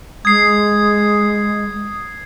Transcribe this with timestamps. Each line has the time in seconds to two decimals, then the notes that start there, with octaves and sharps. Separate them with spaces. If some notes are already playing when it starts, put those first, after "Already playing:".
0.25 G#3 D#6 G#6 C7